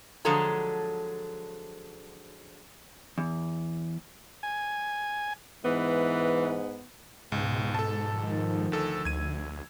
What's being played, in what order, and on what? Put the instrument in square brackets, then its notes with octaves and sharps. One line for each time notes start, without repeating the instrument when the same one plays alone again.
[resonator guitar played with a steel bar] D3 F3 F#3 G#3 A4 A#5
[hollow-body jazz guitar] E2
[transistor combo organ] G#5
[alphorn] G#2 [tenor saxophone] E3 [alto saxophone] B3
[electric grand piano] C#2 [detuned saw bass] G#2 [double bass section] B2
[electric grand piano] A4 A5
[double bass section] D#3 F3
[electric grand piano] D2 A4 E6
[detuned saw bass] D2 [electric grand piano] G#6 D#7